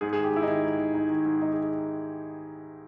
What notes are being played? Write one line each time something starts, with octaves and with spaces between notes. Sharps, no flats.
G#2 G#4
G#4
D#3
G4
G#2 E4
D#4
D#3 E4
G#2
D#3
G#2 D#4
D#3
G#2
D#3 D#4
G#4